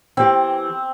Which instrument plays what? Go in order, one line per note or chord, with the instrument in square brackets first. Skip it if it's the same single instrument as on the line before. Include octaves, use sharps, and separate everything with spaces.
[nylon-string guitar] E3 G4 [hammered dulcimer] C4